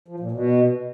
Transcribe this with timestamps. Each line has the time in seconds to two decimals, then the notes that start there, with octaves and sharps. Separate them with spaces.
0.08 F3
0.20 A#2
0.31 B2